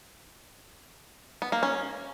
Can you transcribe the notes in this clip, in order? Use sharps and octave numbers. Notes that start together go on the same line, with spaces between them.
B3
A#3
C#4